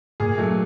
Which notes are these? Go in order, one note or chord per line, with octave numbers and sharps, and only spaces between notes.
A#2 G#4
F#3 A3